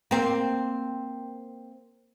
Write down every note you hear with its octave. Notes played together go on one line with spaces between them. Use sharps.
A#3 C4